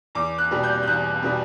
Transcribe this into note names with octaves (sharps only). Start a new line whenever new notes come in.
E2 D6
F#6
B2 G3
G6
G6
E2 F#6
B2 G3